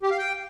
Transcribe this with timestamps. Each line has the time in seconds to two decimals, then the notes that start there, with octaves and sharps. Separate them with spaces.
0.03 G4
0.11 F5
0.18 G5